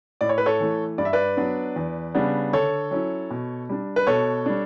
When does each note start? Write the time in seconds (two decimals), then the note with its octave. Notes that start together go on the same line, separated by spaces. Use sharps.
0.21 A2 D5
0.29 C#5
0.38 B4
0.46 A4 C#5
0.60 E3 A3
0.98 G2 D5
1.05 E5
1.13 B4 D5
1.37 F#3 B3 D4
1.76 E2
2.15 C#3 G3 B3 D4
2.53 D3 A4 C#5
2.91 F#3 C#4 E4
3.31 B2
3.69 G3 D4
3.96 B4
4.07 B2 A4 C#5
4.46 G3 D4